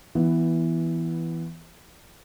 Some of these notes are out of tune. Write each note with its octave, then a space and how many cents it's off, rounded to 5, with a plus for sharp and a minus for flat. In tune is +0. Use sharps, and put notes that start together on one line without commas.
E3 +5 B3 +0